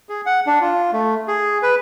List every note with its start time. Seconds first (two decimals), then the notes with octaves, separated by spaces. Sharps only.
0.09 G#4
0.26 F#5
0.47 D4
0.61 F4
0.92 A3
1.28 G#4
1.63 B4